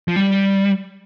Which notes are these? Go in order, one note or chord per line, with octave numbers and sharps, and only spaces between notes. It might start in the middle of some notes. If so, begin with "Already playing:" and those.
F3
G3